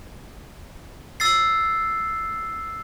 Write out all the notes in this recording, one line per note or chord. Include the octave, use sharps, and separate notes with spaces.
E6 A6 C7